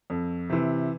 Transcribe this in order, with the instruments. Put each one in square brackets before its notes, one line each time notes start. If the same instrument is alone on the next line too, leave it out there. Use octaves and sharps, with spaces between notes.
[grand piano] F2
C3 E3